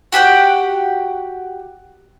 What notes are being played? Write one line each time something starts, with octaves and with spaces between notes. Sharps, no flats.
F#4 G4 F#5 G5